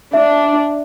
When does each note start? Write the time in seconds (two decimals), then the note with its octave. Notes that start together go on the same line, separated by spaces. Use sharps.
0.13 D4 E5